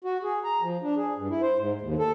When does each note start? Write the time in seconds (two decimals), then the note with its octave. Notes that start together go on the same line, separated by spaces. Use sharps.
0.05 F#4
0.23 G#4
0.44 A#5
0.61 F3
0.83 D4
0.97 G#4
1.16 G2
1.30 E4
1.42 C5
1.58 G#2
1.81 D#2
1.99 A4